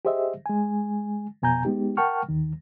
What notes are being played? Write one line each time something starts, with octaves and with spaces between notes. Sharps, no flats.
G4 G#4 C5 D#5 E5
G#3 G#5
F2 B2 G#5 A#5 G6
G#3 B3 D#4 G4
A#4 F#5 G5 A5 C#6 F6
D#2 D#3